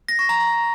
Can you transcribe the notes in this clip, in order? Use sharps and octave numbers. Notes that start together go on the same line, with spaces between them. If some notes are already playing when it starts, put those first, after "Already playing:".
A#6
C#6
A#5